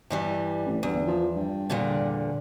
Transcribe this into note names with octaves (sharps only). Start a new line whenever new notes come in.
G2 E3 G3
A1
G1 E2
F3
G2
E2 A#2 D3